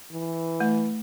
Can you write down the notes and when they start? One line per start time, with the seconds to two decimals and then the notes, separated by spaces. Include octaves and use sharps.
0.12 E3
0.60 A3